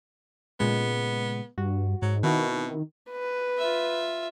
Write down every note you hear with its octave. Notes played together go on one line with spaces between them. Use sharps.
A#2 C#3 G#3 B3
G2 F#4
G#2 F#3
B2 D#3 C4 E4 F#4
B4
F4 E5